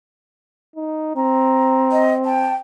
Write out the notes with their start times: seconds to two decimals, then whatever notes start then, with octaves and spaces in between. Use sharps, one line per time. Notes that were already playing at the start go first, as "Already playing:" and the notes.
0.76 D#4
1.16 C4 A#5
1.92 D#5
2.25 G5 A5